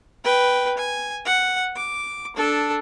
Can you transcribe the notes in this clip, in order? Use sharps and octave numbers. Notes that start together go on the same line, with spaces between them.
B4 G5
G#5
F#5
D6
D4 A4